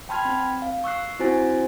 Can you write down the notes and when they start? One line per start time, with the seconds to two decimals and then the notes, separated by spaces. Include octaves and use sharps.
0.09 G5 A5 B5 C6 F6 G#6
0.25 C4
0.62 F5
0.84 C#6 E6 F#6 C7
1.19 C4 E4 F#4 C5 G#5 A6